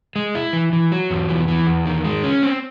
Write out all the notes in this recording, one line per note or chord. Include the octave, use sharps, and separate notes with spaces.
G#3
E4
E3
E3
F#3
E2
E3
E3
E2
D#3
G#3
C#4
C4